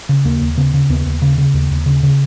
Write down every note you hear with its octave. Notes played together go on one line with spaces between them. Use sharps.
C#3
D#2 A#3
D#2
C#3 B3
C#3
D#2 B3
D#2
C#3
C#3
D#2
D#2
C#3
C#3